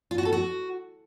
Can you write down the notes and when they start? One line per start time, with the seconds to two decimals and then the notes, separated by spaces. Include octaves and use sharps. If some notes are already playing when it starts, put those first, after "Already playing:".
0.11 F4
0.18 F#4
0.25 A4
0.33 F#4